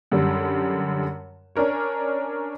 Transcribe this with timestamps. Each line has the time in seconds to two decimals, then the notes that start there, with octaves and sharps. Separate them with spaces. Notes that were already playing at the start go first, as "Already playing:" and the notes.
0.12 F#2 D3 G3
1.56 C#4 D4 A#4 C#5